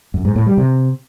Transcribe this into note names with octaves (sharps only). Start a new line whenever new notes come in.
F#2
G#2
A2
G3
C3